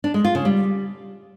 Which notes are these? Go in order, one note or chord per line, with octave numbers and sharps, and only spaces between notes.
D4
G#3
F4
C#3
G3